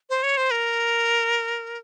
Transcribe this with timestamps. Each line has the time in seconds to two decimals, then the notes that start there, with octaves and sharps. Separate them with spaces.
0.10 C5
0.23 C#5
0.37 C5
0.51 A#4